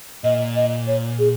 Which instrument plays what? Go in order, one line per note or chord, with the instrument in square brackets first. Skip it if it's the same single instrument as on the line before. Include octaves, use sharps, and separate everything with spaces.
[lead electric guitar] A#2 [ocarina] D#5
[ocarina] D#5
C#5
G#4